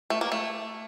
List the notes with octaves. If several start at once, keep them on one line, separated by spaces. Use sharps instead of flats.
A3
A#3
A3